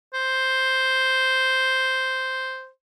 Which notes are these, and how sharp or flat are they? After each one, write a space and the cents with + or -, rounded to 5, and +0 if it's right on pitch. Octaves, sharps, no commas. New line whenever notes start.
C5 +0